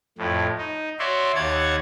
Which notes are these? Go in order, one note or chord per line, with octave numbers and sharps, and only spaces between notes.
F2 A2
D#4
F#4 C#5 D5 E5 C6
D#2 C#5 F#5 A5 G#6